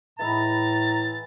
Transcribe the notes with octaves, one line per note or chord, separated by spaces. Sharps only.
A2 E3 G#3 E4 A#5 A6